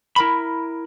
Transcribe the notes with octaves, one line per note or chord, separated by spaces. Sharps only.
E4 A#4 B5